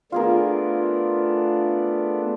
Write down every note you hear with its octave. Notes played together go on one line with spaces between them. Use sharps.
A3 B3 D4 F4 G#4 A#4